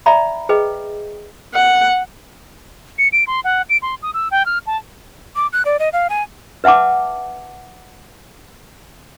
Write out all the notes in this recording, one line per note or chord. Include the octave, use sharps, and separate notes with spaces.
D5 E5 G5 A#5 B5
G#4 B4 D#5 G5
F#5
C#7
D7
C6
F#5
D7
C6
D#6
E6
G5
F6
A5
D6
F#6
D5
D#5
F5
G#5
B4 E5 F#5 A5 D6